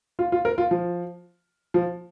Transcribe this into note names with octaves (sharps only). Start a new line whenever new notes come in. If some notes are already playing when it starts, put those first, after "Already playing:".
F4
F4
A#4
F4
F3
F3